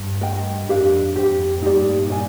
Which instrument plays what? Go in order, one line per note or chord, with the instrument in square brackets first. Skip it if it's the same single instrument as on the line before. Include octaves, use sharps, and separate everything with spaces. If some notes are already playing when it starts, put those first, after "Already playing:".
Already playing: [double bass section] G2
[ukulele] A#4 D#5 G5
[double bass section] F2 G#2 [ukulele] D4 G4 A#4 F5
[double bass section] F2 G#2 [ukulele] G4 C5 G5
[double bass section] G2 A#2 [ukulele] D#4 G4 D5
[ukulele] D#4 A#4 D5 G#5